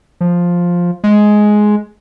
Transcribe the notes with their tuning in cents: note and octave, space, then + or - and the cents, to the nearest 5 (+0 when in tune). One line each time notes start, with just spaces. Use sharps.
F3 +5
G#3 +10